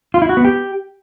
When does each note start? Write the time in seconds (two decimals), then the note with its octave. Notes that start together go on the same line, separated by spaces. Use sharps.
0.14 F4
0.22 E4
0.29 F#4
0.37 B3
0.45 G4